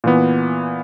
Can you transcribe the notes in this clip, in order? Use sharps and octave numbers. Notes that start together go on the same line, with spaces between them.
A#2 E3 B3